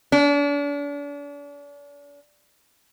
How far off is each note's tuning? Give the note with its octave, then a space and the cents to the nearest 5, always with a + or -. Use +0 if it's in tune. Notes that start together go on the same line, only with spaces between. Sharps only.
D4 -40